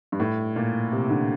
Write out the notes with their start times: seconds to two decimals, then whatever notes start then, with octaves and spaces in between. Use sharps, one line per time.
0.12 G2
0.20 A2
0.56 A#2
0.92 C3
1.10 D3